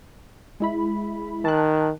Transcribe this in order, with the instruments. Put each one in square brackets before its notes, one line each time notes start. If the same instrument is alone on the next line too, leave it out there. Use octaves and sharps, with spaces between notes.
[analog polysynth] G#3 E4 B5
[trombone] D#3 [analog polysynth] A5 F#6